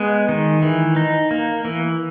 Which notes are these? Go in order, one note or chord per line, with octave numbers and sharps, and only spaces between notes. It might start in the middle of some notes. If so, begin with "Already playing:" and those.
Already playing: G#3 B3
D#3
E3
D#4
A#3
E3